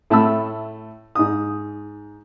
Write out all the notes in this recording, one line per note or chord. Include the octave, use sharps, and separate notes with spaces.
A2 A3 A5 B5 E6
G#2 D#6